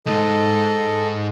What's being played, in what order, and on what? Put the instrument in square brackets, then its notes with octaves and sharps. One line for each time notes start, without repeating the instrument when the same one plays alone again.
[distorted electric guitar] B1 G#2 [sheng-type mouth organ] A4 D#5